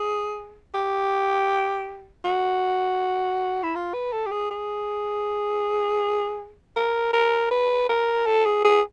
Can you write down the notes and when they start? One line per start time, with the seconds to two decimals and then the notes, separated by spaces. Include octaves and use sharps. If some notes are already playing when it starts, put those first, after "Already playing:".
Already playing: G#4
0.74 G4
2.24 F#4
3.63 E4
3.75 F4
3.94 B4
4.12 A4
4.26 G4
4.31 G#4
4.51 G#4
6.76 A#4
7.13 A#4
7.51 B4
7.89 A#4
8.26 A4
8.45 G#4
8.65 G#4